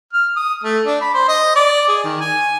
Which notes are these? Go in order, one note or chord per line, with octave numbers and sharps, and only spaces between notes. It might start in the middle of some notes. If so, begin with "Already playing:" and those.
F6
D#6
A3
D4
B5
C5
D#5
D5
G#4
D#3
G#5